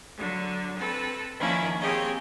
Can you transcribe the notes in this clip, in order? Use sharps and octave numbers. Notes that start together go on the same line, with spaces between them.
D3 F#3
C4 A4 B4
D#3 F3 A#3 C#4 D4 E4
A#3 C4 G4 G#4 C#5 D#5